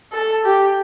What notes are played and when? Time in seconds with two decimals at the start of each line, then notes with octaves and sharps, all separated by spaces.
0.12 A4
0.45 G4